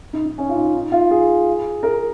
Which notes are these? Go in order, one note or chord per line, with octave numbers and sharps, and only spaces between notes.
D#4
D#4
C#4
F4
D#4
D#4
F4
G#4
A#4